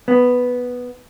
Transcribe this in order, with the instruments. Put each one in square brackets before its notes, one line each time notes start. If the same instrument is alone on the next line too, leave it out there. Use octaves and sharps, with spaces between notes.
[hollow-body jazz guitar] B3